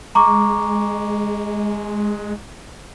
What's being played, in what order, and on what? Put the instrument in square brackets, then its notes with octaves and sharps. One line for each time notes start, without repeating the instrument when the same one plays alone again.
[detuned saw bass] G#3 [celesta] A#5 C#6 D6